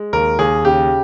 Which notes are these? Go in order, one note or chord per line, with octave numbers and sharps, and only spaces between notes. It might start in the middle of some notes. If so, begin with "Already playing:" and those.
Already playing: G#3
D#2 A#4
D#2 G#4
C#3 G4